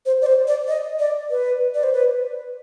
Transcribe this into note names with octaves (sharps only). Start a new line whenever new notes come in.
C5
D5
C5
D5
D#5
D5
B4
D5
C5
B4